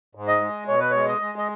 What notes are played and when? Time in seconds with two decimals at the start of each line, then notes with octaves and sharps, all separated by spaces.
0.15 G#2
0.28 D#5
0.41 G#3
0.68 B2 C#5
0.80 B4
0.91 G#3 C#5
1.08 D#5
1.21 G#3
1.38 D#5